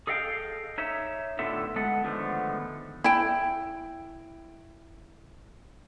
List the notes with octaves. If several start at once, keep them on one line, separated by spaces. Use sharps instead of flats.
G#4 A4 D#5 F5 G5
D#4 C#5 E5
A2 D3 B3 F4 A4 E5
G#3 B3 A4 F#5
D3 D#3 F3 G#3 A3 B3
E4 G5